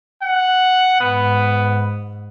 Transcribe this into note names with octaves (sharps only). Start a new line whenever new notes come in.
F#5
G#2 B3